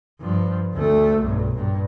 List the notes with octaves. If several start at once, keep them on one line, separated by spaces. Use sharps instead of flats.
G2 F3
D2 A3
B1 G2
G2 A#2